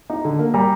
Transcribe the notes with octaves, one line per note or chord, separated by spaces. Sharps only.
D#4
D3
A#3
G3 A#5